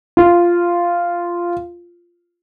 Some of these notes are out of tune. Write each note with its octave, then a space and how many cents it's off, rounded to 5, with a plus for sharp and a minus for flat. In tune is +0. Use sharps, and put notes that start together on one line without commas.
F4 -5